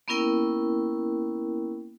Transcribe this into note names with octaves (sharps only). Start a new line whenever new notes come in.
A#3 B3 C#4 E4 A#4 G5